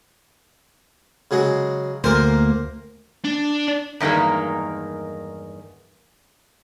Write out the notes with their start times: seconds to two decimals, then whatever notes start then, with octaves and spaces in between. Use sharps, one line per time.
1.31 C#3 F#3 G#3
2.04 D2 A#3 A#4 C5
3.25 D4
4.00 E2 G2 D#3 G#3 A#3